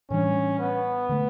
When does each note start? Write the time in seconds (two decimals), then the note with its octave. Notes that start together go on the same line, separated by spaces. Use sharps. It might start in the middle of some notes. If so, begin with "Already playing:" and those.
0.10 A2 E3 G3 C#4 D4
0.59 B3
1.09 D3 A3